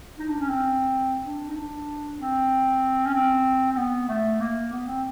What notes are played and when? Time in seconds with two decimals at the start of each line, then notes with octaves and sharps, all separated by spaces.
0.19 D#4
0.28 D4
0.39 C#4
0.49 C4
1.24 D4
1.48 D#4
1.55 D4
2.18 C4
3.06 C#4
3.14 C4
3.72 C4
3.77 B3
4.09 A3
4.40 A#3
4.72 B3
4.87 C4